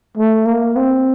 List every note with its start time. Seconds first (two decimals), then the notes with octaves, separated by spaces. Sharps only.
0.17 A3
0.46 A#3
0.76 C4